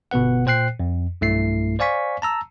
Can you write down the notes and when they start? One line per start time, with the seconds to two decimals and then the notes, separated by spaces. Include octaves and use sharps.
0.11 G1 B2 B3 B4 F#5
0.46 A#2 C5 G5 F#6 C7
0.80 F2
1.21 B1 G2 A3 E4 C7
1.79 C5 D5 F5 G#5 C#6 B6
2.22 A5 A#5 E6